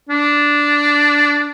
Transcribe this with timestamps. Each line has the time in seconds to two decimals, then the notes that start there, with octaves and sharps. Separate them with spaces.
0.09 D4